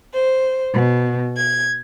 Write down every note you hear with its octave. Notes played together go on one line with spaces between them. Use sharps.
C5
B2
G#6